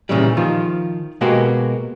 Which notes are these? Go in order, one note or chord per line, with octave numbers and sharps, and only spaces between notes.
A#2 C#3 E3 G3
D#3 F3 F4
B2 G#3 A#3 B3 F#4 G4